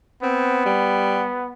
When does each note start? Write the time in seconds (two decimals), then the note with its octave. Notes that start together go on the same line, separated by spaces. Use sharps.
0.22 B3 C4
0.65 G3